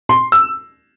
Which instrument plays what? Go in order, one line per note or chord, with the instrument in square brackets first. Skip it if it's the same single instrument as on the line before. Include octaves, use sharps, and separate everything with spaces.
[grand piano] C6
E6